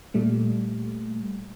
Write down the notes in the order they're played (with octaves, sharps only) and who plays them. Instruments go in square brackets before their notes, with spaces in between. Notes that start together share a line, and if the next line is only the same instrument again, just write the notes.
[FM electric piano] A#2 G3 A3